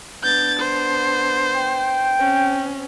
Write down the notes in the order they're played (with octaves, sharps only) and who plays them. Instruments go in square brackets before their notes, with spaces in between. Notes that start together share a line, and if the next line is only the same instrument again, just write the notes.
[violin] B3 D4 [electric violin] G6 A6
[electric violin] C5
[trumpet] G5
[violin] C4 C#4